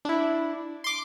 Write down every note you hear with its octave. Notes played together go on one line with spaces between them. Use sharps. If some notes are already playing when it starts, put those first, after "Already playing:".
D4 E4
C6 D6